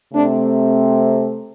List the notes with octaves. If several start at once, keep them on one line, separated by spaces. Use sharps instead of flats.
C3 A3 C4 D4